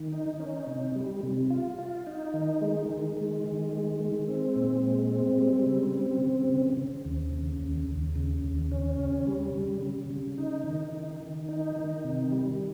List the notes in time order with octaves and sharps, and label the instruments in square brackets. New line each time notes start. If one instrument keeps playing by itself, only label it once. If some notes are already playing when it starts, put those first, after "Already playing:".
Already playing: [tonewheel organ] D#3
D#4
C#4
C3
G3
C3
F4
F4
D#4
D#3
G#3
D#3
G#3
D#3
G#3
G#3
C4
A#2
G#3
C4
G3
C#3
C4
C#3
C#3
C#3
D#2
C#3
D#2
D#2
C#3
D#2
C#4
C#3
G3
C#3
C#3
C#3
D#4
D#3
D#3
D#3
D#4
D#3
C3
G3